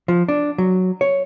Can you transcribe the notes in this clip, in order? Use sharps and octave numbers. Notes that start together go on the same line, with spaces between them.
F3
D4
F#3
C#5